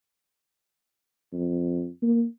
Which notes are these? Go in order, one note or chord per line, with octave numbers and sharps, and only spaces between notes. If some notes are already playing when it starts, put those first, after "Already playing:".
F2
A#3